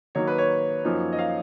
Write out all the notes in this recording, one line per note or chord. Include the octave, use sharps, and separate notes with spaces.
D#3 F#3 A#3 D#4 C#5
B4
C#5
F#2 F3 A#3 D#4
D#5
F5